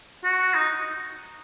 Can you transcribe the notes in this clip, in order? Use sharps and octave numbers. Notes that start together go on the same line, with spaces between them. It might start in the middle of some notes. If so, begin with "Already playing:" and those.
F#4
D#4